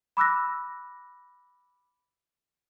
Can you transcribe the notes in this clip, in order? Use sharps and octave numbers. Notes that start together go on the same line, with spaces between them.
B5 D6 E6 F#6 A#6